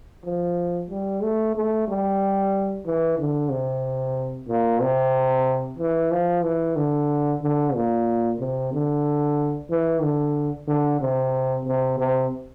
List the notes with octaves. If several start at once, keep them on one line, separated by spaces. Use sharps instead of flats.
F3
G3
A3
A3
G3
E3
D3
C3
A#2
C3
E3
F3
E3
D3
D3
A#2
C3
D3
E3
D3
D3
C3
C3
C3